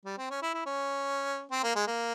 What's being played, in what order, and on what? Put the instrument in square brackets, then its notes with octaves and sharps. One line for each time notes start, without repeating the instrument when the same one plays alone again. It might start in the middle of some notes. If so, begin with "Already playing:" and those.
[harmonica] G3
C4
C#4
E4
E4
C#4
C4
A#3
G#3
A#3